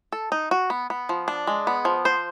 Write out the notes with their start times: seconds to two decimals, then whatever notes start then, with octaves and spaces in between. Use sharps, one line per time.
0.12 A4
0.32 D#4
0.51 F#4
0.70 B3
0.90 B3
1.09 F3
1.28 D4
1.47 G#3
1.67 B3
1.85 F3
2.05 C5